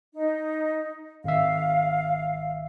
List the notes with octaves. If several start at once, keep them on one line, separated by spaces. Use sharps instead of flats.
D#4
G#1 E5 F5